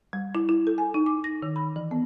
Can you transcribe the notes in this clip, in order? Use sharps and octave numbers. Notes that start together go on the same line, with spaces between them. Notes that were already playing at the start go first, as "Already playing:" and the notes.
G3
E4
E4
A4
G#5
D#4
D6
A#6
D#3
B5
E3
B3